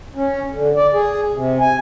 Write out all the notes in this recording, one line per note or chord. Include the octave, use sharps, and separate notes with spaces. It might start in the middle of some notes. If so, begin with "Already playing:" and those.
C#4
D3
D5
G#4
C3
G#5